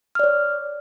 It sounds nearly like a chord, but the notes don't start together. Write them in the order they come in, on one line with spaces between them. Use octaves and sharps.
F6 D5 C#5